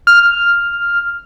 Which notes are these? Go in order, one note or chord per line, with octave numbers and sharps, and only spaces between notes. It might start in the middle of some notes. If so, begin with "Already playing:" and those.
F6